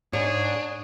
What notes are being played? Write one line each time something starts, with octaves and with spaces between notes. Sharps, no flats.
G#2 D4 G#4 C#5